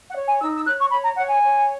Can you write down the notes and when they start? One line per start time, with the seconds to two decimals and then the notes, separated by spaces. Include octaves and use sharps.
0.09 F#5
0.16 C#5
0.26 G#5
0.41 D#4 E6
0.55 E6
0.67 C#5 F#6
0.80 C#6
0.91 C#5 B5
1.04 A#5
1.17 C#5 F#5
1.29 G#5
1.42 C#5